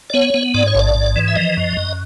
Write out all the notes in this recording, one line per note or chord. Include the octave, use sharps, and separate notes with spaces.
D5
B3 C#5
B3
G#2 D5
C#5
A1 D5
G#2
E3
E5
F3 D#5
F#2
F#2